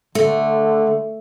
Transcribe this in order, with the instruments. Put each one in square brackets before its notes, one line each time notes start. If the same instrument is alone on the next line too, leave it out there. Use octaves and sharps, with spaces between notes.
[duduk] D3 [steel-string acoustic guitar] A3